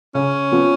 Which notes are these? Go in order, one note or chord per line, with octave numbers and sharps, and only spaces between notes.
C#3 C#4
F3 B3